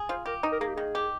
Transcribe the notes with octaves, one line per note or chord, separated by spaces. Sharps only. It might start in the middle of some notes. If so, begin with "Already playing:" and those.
Already playing: G#4
F4 C5
G4 A#4
D#4
A#4
A#3 G#4
G4
D#3 G#4
G4